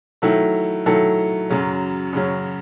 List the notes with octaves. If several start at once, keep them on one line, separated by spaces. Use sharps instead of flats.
D#3 F#3 A3 E4 A4
D#3 F#3 A3 E4 A4
F#2 C#3 F#3 C#4
F#2 C#3 F#3 C#4